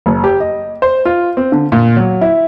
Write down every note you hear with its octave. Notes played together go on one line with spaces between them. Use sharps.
F#1
G4
D#5
C5
F4
C4
D3
A#2
F#3
E4